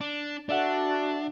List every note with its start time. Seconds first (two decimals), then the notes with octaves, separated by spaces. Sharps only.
0.01 D4
0.49 D4 F#4 A4 D5 E5 F#5